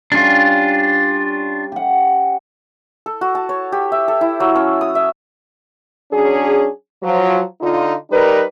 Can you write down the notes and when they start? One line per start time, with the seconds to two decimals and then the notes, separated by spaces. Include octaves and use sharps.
0.12 G3 C#4 D4 F4 F5
1.72 G4 F#5
3.06 A4
3.21 F#4
3.35 A5
3.49 C#5
3.72 G4
3.92 E5
4.08 A4
4.21 E4
4.40 F#3
4.55 C#4
4.81 D#6
4.95 E5
6.12 F#3 C#4 D4 G#4
7.03 F3 F#3
7.61 D3 D#4 F4
8.11 G3 D#4 A#4 B4